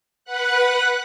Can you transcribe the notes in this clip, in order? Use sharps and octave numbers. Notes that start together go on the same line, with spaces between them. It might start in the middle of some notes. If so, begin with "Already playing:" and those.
B4 F#5 F#6